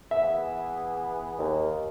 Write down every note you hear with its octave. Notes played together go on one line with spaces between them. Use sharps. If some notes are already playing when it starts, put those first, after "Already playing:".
E3 B3 G#4 E5
D#2